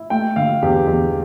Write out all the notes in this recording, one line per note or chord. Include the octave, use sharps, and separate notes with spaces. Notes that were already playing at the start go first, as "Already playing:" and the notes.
Already playing: E4
A3 G5
D3 F5
E2 G4
E2